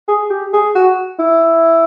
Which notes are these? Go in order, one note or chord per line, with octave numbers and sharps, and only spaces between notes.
G#4
G4
G#4
F#4
E4